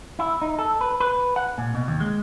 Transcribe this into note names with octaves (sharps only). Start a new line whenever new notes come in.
E4
D#4
A4
B4
B4
F#5
A#2
B2
D#2
G#3